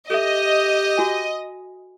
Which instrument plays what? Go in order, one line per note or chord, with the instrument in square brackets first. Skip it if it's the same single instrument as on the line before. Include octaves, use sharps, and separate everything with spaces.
[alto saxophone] G4 [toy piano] A4 E5 [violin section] D#5
[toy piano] F#4 G#5